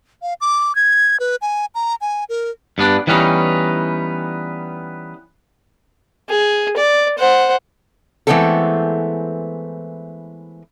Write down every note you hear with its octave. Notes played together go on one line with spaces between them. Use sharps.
F5
D6
G#6
B4
G#5
A#5
G#5
A#4
G2 B3 D4
E3 G3 B3 C#4 D#4
G#4
D5
C5 F#5
E3 G#3 A3 B3 C4 A4